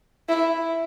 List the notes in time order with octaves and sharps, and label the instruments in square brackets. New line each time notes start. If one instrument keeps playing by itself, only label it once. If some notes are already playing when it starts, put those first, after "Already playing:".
[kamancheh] E4